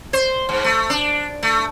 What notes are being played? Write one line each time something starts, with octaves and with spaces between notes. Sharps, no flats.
C5
G#2
A3
D4
A3